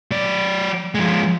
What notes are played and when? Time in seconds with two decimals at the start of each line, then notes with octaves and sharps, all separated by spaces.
0.11 F#3 D5
0.95 F3 G#3